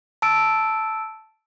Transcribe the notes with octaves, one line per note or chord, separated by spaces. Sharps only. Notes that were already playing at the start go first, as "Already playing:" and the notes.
A5 E6 D7